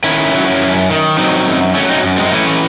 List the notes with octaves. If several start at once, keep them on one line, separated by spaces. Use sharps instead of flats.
D#3 C#4 E4
F#3
F#2
D#3
F#3 C4 D#4
F#2
F#3 A3 C#4
C4 D#4
F#2
G#3 C4
D#4
E3 A3 C#4